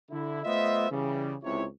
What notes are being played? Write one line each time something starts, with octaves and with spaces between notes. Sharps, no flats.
D3 E4
A3 B3 F4 C5 D#5 E5
C#3 E3 G3
C#2 C3 E4 C#5